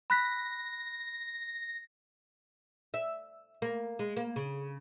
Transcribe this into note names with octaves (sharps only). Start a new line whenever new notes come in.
B5 F#6 A#6 B6
E5
A#3
G#3
A#3
C#3